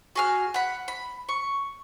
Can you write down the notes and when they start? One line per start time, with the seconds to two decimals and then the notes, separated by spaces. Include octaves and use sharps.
0.15 F#4 G#4 F6
0.54 F#5 B5
0.88 B5
1.29 C#6